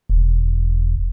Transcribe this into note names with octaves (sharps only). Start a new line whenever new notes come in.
E1